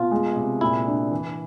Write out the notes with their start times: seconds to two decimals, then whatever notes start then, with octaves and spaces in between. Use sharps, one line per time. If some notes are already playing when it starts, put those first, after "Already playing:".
Already playing: B2 F4
0.11 G#3
0.36 C3
0.61 A#2 E4
0.87 D4
1.11 E3